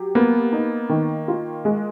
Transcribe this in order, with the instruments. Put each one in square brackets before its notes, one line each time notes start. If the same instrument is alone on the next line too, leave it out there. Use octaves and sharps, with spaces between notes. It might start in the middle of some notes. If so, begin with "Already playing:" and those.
Already playing: [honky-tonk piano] F#3 G4
[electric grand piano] A#3 [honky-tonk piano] B3
[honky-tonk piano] D#4
D#3
F4
G#3